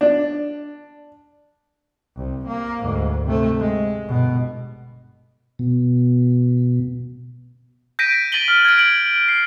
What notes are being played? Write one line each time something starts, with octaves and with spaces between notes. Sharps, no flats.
D4
C2
A#3
D2 G#2
C3 A3
G#3
G1 B2
B2
G6 A#6 B6 D7 D#7
A6 B6 D#7 F#7 G7
F6
G#6 D7
F#7
C7